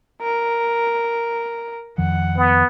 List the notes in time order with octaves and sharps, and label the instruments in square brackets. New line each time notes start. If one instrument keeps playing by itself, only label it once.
[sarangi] A#4
[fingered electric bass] F2 D#3 F3 [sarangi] F#5
[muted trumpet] B3